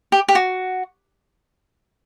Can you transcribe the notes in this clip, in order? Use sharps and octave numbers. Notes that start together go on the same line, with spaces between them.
G4
G4
F#4